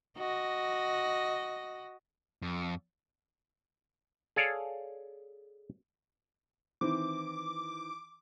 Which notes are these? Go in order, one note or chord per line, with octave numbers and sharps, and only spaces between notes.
F#4 D#5
F2
G#4 A4 C#5 D5 F5
D#3 E3 C4 D6